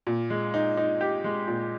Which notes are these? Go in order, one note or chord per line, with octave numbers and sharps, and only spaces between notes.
A#2
G#3
D#4
D#4
G4
G#3
A#2